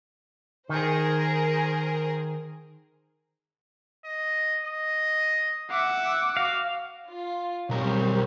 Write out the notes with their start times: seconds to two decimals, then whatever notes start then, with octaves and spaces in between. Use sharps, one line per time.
0.69 D#3 G#4 A#4 C5
4.05 D#5
4.66 D#5
5.71 E5 F#5 D6
6.37 F#4 F5
7.09 F4
7.70 B1 G3 C4 A#4 C#5